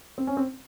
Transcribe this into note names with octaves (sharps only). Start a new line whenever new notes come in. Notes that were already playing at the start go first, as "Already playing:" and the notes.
C4
C#4
C4